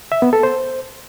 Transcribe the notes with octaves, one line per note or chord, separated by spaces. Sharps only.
E5
B3
A4
C5